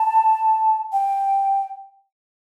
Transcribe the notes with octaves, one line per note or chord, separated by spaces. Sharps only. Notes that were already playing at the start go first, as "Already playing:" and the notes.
Already playing: A5
G5